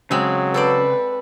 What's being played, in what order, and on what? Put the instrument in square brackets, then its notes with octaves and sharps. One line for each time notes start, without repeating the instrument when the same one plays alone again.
[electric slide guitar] C#3 [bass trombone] F#3 [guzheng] G#3 C4
[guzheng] A4 C5 D5 [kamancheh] B4